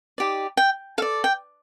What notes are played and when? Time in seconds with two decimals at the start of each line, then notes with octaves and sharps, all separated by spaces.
0.18 D#4 G4 D5
0.57 G5
0.98 A4 F5
1.02 D5
1.24 G5